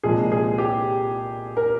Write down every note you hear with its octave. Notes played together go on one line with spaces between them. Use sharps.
C2 A#2 F3 G#3 G#4
G#4
G4
A#4